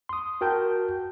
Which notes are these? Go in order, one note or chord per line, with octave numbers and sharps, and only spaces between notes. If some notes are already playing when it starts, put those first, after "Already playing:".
C6 D#6
F#4 A#4 G5 A5 G6